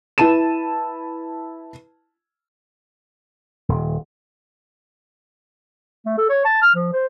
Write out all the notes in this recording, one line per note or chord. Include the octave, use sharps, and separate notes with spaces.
E4 B4 A5 D#7 E7
D#1
A3
A4
C#5
A5
F6
F3
C5